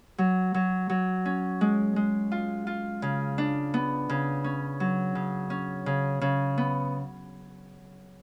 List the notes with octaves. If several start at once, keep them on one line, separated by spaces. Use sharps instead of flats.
F#3
F#3
F#3
C#4
G#3
G#3
F4
F4
C#3
D4
B3
C#3
C#4
F#3
C#3
C#4
C#3
C#3
B3